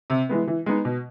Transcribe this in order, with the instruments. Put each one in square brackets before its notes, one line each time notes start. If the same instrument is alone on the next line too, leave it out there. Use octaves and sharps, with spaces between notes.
[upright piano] C3
E3 G#3 B3
E3
G#3 B3 D#4
B2